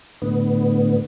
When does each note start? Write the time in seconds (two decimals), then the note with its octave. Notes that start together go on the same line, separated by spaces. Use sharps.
0.22 A2 D3 B3